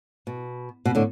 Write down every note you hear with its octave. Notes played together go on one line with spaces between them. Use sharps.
B2
B2
A2 D3